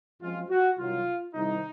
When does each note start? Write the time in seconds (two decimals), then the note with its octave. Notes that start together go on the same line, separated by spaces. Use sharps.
0.20 F#2 F3 G#3 C4 F4
0.49 F#4
0.77 C2 C3 D#3 F#3 F4
1.34 C2 C3 D#3 D#4